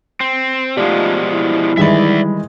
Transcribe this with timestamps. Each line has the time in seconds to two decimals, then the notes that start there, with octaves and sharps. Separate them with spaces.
0.20 C4
0.77 B2 F3 G#3 A3 D#4 F4 G4 D5
1.32 E4
1.77 D#3 E3 G3 G#3 D5 E5 B5